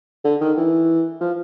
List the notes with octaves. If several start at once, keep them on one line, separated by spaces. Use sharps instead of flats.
D3
D#3
E3
F3